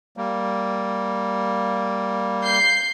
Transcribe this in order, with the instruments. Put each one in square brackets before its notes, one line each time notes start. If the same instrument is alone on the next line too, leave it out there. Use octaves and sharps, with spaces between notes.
[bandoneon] G3 A#3
[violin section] G6 C7